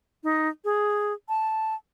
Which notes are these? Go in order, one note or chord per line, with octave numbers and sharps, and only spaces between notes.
D#4
G#4
A5